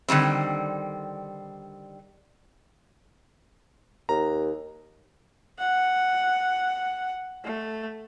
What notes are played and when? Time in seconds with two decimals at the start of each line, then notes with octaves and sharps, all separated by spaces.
0.08 D3 D#3 G3 C4
4.09 D#2 A#5
5.59 F#5
7.44 A3